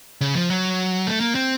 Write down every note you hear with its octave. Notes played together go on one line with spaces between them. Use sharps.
C#3
F3
F#3
A3
A#3
C4